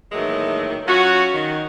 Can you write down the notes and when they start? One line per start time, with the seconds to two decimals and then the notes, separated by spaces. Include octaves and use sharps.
0.12 A2 D#3 E3 F#3 G#3 A#3
0.86 F#3 C#4 F4 F#4
1.33 D#3